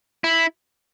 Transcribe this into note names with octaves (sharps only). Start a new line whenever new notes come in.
E4